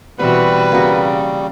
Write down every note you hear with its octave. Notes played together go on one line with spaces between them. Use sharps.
B2 E3 G3 C4 F#4 B4
C#3 A#3 F#4